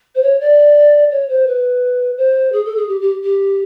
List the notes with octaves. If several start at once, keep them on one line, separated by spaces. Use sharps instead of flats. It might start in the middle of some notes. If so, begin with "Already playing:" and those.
C5
C#5
D5
C#5
C5
B4
C5
G#4
A4
G#4
G4
G4
G4